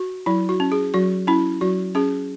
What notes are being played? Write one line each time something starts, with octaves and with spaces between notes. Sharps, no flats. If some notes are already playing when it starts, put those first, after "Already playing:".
Already playing: F#4
F#3 E4
F#4
C#4
G#4
F#3 F#4
C#4 E4
F#3 F#4
C#4 G#4